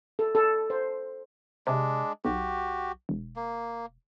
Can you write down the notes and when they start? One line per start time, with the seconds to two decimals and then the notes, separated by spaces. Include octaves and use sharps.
0.19 A4
0.35 A4
0.70 C5
1.67 C3 G#3 D4
2.25 B1 F#4 G4
3.09 E1
3.36 A#3